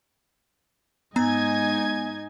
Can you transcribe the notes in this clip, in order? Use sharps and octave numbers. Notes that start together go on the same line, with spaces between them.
G#2 B3 D#4 D#5 G#5 A#5 G#6